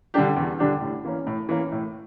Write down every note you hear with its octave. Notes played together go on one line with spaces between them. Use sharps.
D3 G3 D4 G4
E2
D3 G3 D4 G4
A2
E3 A#3 C#4
A2
E3 A#3 C#4
A2